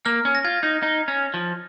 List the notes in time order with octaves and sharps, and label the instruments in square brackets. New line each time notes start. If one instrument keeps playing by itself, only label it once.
[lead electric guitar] A#3 [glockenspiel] F6
[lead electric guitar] C#4
[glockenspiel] A#6
[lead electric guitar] F4 [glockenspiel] G#6
[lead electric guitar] D#4
D#4
C#4
F3